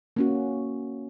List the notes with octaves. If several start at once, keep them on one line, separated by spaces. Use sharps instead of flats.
A#3 C#4 F#4